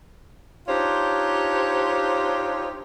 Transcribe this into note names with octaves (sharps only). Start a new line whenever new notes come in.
D4 D#4 F4 G4 C5 C#5